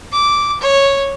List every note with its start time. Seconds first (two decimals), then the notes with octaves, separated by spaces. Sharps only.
0.12 D6
0.61 C#5